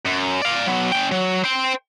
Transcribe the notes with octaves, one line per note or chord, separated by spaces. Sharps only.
F#2
D5 F5
F#3 B3
C#4 G5
F#3
C5 G5